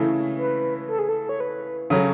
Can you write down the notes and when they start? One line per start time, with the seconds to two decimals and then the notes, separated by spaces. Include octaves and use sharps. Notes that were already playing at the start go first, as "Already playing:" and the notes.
Already playing: C#3 E3 A3 C#4 E4
0.38 B4
0.88 A4
0.99 G#4
1.09 A4
1.29 C#5
1.40 B4
1.90 C#3 F#3 C#4 A4